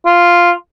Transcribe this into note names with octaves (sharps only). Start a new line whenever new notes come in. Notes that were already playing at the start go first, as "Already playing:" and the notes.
F4